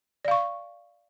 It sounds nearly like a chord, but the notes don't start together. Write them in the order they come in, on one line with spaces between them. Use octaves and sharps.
D5 F5 C#6